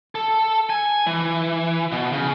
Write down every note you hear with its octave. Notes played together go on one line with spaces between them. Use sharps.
A4
G#5
E3
B2
C#3